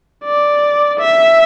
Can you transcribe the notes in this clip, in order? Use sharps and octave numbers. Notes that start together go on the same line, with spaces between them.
D5
E5